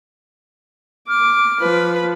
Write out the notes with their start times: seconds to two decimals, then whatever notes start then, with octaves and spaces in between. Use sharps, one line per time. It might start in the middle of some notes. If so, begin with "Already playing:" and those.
1.08 D6 F6
1.61 F3 B4